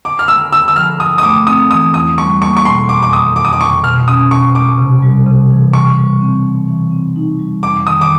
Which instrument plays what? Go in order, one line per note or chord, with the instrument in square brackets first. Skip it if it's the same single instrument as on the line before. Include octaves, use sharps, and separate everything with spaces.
[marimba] D3 [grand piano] D6
[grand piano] F6
[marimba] G#3 [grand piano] E6
[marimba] D3 [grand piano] E6
[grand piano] E6
[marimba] F3 [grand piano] F6
[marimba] G2 [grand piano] D#6
[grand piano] D#6
[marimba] A3 [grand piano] D6
[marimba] C4 [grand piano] D#6
[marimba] E3 [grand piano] D#6
[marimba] E2 [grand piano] D#6
[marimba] G3 [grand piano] C#6
[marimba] A#3 [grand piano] C#6
[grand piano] C#6
[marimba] B2 [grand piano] C6
[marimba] F2 [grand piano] D6
[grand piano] D6
[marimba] D#3 [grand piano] D#6
[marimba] F2 [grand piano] D6
[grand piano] D#6
D6
[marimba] C3 [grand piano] C#6
[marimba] B2 [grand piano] F6
[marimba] C#4 [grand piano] D#6
[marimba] B2 [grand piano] C#6
[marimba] G#3 [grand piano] D6
[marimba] C3
G3
C3
E3
[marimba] C3 [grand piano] C#6
[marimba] G3
C4
E3
E3
C4
D#4
G3
[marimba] F2 [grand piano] D6
[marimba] D#3 [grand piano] D#6
[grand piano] D6